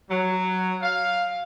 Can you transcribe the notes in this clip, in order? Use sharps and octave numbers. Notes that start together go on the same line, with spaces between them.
F#3
F5